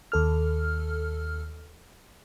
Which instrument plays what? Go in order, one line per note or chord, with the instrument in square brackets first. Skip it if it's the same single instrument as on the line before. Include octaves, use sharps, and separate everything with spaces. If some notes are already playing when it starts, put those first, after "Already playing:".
[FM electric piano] D#2 A4 F6